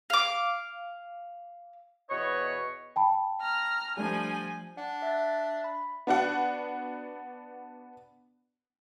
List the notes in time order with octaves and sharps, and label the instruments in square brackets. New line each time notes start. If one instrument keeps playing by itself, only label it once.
[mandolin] F5 D6
[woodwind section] E2 B2 B4 C#5 D#5 C#6
[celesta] G5 A5 B5
[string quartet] A#5 F6
[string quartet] F3 G#5 [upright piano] G3 A3 D4
[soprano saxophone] D4 [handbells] F#5
[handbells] E5 F#6 A6
B5
[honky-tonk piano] B3 D4 F#4 F#5